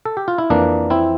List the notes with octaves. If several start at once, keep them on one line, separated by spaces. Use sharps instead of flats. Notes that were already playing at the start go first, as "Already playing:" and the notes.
A4
G4
F4
E4
F2 E3 A#3 D4
C4 E4